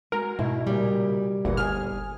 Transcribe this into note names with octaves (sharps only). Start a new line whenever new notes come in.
G#3 F#4 A#4
G#2 B2 E4
A#2 C#3 G3 G4
G1 D2 A#2 E3 F#5
G#4 G#5 F6